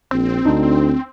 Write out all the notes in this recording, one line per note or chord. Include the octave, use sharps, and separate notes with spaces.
A#1 C4
D2 D4 D#4